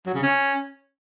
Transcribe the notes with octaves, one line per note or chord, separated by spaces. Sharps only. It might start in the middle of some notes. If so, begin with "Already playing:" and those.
F#3
C#3
C#4